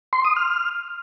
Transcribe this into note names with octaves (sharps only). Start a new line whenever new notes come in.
C6
D#6
F6